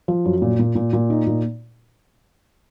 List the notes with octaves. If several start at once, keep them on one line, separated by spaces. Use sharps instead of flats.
F3
F#2
A#2
A#2
A#2
A#2
D#4
A#2